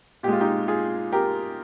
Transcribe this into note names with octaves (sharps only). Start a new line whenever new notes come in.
A#2 G#3 F4 G4
D#4 G4
F4 G#4
G4 A#4